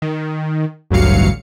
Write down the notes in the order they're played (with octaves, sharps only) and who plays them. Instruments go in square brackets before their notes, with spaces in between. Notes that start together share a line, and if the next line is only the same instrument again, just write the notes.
[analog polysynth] D#3
A1 D2 G2 F#3 F5 C#7